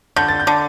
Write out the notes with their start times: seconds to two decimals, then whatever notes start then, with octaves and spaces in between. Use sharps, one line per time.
0.16 D3 G6
0.28 A6
0.40 G6
0.47 D3